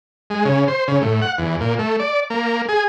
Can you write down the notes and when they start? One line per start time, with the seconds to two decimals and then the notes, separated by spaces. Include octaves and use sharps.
0.30 G#3
0.45 C#3
0.68 C5
0.88 C#3
1.02 A2
1.22 F#5
1.38 E2
1.61 A#2
1.79 A3
2.00 D5
2.30 A#3
2.69 G#4